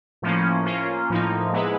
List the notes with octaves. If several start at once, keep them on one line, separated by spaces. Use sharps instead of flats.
A2 F3 A#3 C#4
A#3 C#4 F4
A2 F3 A#3 D#4
G#3 B3 E4 G#4 B4